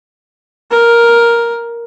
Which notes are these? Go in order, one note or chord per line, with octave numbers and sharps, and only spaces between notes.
A#4